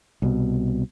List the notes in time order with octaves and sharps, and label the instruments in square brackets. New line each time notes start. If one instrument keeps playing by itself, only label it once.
[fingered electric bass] C2 B2